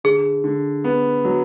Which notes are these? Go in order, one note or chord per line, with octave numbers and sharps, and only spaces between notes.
D3 G#4
D3
B3
F#3